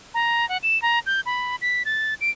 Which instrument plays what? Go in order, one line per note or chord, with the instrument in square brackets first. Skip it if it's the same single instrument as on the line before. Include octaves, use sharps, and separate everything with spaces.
[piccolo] A#5
F#5
E7
A#5
G6
B5
B6
A6
D7